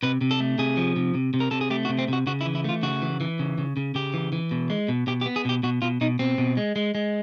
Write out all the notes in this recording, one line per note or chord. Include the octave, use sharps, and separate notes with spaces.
C3 B4
C3
A4
A3
C3 G#4
F3
C3
C3
C3
A#4
C3 A4
G#4
A3 G4
F#4
C3
C4
C3 F#4
C#3 F#4
E4
E3
E4
A3 F4
C#3 F#4
E3
E3
C#3
C#3
C#3
C#3 G4
E3
E3
B2
G#3
B2
B2 G4
G4
B3
G#4
B2 G4
B2 F#4
B2 F4
B2 D#4
B2 C4
B2
G#3
G#3
G#3